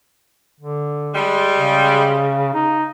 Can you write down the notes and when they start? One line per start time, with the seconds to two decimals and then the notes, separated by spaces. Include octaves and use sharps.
0.60 D3
1.15 G3 G#3
1.58 C#3
2.54 D#4